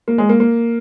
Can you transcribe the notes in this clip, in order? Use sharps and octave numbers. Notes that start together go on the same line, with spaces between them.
A#3
G#3
A#3
A#3